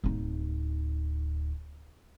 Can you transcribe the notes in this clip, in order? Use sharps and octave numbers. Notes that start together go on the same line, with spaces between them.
D1 D#4